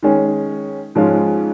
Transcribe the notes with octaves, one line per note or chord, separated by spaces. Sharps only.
D#3 G#3 C#4
G#2 F3 G#3 C#4 F4